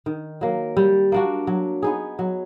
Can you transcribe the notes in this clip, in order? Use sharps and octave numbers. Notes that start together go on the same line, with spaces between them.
D#3
F#3 A#3
G3
A#3 D4 F#4
F#3
B3 D#4 G#4
F#3